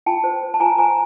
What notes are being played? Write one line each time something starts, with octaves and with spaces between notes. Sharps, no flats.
F4 G5 A5
C5
C5
A5
F4 G#5 A#5
C5 G#5 A#5